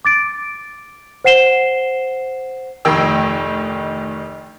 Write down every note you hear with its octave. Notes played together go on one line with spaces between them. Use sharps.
D6 A6 D7
C5 F#5 C7 E7 G7
F1 D2 D#3 D#5 G5 E6